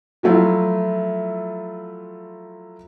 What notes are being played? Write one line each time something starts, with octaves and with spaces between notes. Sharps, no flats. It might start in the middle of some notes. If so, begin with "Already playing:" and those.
F3 F#3 A3 E4 F4